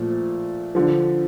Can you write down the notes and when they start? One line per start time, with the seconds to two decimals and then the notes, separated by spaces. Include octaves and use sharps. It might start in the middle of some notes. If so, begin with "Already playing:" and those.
Already playing: A#2 F3 A3
0.75 D3 F3